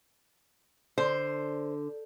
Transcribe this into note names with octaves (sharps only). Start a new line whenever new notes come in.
D3 C5